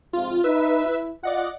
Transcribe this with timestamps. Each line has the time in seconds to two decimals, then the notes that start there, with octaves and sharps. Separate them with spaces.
0.13 F2 G#2 C3 F4
0.44 D#4 B4 E5
0.86 E4
1.23 F4 D5 D#5 F#5